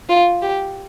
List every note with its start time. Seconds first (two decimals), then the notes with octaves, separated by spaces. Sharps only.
0.09 F4
0.42 G4